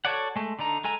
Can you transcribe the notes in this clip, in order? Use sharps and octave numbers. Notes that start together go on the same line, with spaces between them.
F#4 A4 C#5 D5 F#5
G#3 A3
D3 D4 D#4 A#5
G#3 A4 G#5 A#5